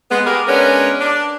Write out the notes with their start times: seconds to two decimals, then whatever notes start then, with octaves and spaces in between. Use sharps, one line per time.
0.10 G#3 B3
0.26 B3 G4 G#4 A#4
0.47 G#3 B3 C#4 D4 A#4
1.00 D4